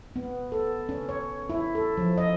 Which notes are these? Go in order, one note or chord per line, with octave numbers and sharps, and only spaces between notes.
B3
A4
C#4
C#5
E4
A4
F3
D#5